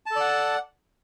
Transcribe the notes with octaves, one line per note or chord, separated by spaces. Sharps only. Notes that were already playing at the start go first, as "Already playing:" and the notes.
A4 D5 F#5 A5